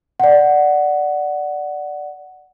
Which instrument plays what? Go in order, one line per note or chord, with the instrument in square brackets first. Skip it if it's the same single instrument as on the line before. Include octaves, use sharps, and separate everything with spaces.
[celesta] D5 F#5